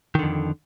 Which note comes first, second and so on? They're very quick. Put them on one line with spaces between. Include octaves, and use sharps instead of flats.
D#3 D3 F2